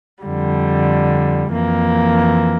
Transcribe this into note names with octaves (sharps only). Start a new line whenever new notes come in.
F2 D3 G3
F2 E3 A#3